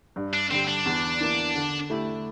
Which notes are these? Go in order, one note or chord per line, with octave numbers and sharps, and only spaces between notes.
G2
D4
D3 G3 C4
D4
E2
E3 A#3
D3
A3 E4 G4